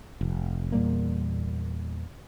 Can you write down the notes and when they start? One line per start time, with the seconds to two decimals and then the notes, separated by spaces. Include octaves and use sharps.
0.21 F1
0.72 E2 A#2 G3 A#3